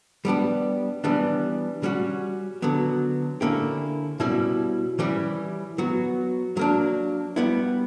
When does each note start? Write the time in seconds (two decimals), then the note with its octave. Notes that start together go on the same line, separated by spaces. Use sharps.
0.25 G3 B3 D4 G4
1.04 E3 G3 B3 D4
1.83 G3 C#4 F#4
2.62 D3 F#3 B3
3.41 D3 A#3 C#4 E4 G4
4.20 B2 G3 C#4 E4
4.99 E3 G3 C#4 E4 G4
5.78 F#3 B3 F#4
6.57 F#3 A#3 D4
7.36 G3 B3 E4